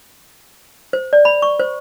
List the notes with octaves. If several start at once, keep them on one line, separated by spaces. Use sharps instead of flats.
C5
D5
B5
C#6
C5